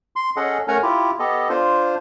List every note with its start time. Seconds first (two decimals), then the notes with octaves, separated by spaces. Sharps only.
0.16 C6
0.36 C#4 G#4 A4 D#5 F#5
0.68 A3 C#4 A#4 F#5 G#5 A#5
0.82 E4 F4 G4
1.19 B3 G4 A4 D#5
1.49 D4 F4 C5